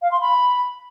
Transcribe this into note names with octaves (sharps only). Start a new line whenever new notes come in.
F5
C6
B5